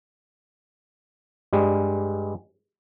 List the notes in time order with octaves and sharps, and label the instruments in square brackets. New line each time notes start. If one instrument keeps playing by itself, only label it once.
[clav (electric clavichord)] G2 G3 G#3